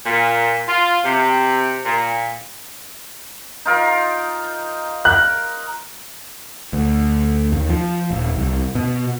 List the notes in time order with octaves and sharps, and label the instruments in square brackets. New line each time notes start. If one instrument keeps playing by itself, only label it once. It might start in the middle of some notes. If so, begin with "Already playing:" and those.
[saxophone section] A#2
F4
C3
A#2
[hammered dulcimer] D#4 F4 A#4
[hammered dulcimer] A#4 [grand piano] F#6
[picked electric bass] D2
D#2
F3
D#1
C2
B2